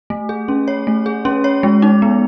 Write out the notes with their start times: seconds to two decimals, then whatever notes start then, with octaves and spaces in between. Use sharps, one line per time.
0.10 A3
0.29 G#4
0.48 C#4
0.68 C#5
0.87 A3
1.06 G#4
1.25 C#4
1.44 C#5
1.63 G#3
1.82 D#4
2.02 B3